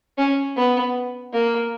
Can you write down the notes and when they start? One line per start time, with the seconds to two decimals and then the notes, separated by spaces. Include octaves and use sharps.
0.18 C#4
0.56 B3
1.33 A#3